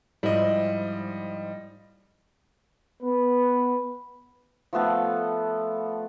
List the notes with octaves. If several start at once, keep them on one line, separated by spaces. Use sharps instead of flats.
G#2 F3 G3 E4 D#5
B3 B4
F3 A3 B3 A4